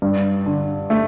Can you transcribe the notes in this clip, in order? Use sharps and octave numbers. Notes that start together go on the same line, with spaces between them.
G2
D3
A3